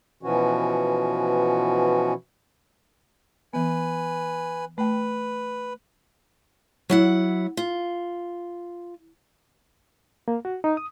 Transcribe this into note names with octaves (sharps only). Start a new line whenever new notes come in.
B2 E3 F3 C#4 F#4
E3 B3 B4 G#5
A3 B4 G5
F#3 E4 F#5
F4
A#3
F#4
D#4
D#6